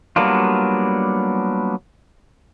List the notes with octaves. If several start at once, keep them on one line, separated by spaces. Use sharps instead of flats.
F#3 G3 A#3 B3 D4 F4